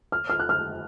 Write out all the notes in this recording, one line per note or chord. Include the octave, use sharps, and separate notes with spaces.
F6
F6
F#6
F6